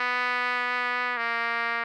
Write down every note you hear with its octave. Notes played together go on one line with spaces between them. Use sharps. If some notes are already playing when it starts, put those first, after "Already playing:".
Already playing: B3
A#3